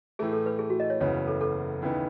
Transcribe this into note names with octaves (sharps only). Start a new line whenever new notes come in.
A2 E3 A3 G#4
A4
B4
G#4
F#4
D#5
C#5
F#1 E2 C#3 E3 B3 C#5
B4
A4
A4
D#2 C#3 E3 B3 D#4